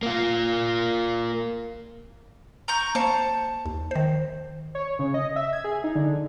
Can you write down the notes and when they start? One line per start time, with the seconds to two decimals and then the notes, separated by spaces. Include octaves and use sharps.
0.03 A#3 F4
2.68 A#5 C#6 G6
2.95 A#3 C5 A5 C#7
3.66 D#2
3.91 D#3 C5
4.75 C#5
4.99 C#3
5.14 D#5
5.36 E5
5.53 G#6
5.64 G#4
5.84 D#4
5.95 D3